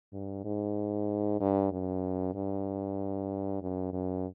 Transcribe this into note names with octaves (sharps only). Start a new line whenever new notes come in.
G2
G#2
G2
F#2
G2
F#2
F#2